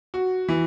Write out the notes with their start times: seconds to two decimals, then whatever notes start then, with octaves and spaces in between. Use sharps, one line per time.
0.14 F#4
0.48 E3